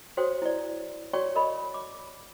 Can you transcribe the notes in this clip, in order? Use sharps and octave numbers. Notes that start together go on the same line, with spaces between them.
F#4 C5 C#5 G5 D#6
E4 D5
F#4 C#5 D5 G5 C#6
A#4 D#5 B5
D6